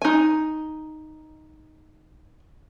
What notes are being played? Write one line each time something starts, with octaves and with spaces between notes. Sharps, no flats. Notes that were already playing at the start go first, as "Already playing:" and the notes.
D#4 G#5